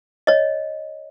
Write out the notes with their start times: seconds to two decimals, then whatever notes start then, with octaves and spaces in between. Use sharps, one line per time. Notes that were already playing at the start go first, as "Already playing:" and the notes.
0.27 C#5 D#5